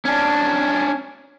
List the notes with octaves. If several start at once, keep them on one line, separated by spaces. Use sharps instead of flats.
C#4 D4